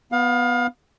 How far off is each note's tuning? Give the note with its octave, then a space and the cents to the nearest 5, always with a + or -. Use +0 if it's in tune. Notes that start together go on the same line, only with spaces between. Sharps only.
B3 +0 F5 +30